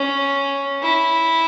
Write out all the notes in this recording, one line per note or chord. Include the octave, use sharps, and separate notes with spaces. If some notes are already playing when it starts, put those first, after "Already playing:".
Already playing: C#4
E4